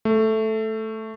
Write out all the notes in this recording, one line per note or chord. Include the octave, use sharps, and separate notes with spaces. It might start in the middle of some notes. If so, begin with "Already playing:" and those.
A3